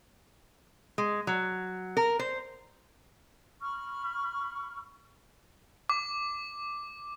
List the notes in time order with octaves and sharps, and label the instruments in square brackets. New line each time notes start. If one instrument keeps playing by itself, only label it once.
[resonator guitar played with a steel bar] G#3
F#3
A#4
C5
[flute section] B5 C#6 F6
[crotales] D6